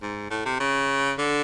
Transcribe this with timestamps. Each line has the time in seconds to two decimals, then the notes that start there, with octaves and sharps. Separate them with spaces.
0.02 G#2
0.31 A2
0.45 C3
0.60 C#3
1.18 D3